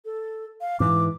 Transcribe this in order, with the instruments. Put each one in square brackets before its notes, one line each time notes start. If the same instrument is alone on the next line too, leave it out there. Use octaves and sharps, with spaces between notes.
[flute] A4
F5
[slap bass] G#2 E3 [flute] D6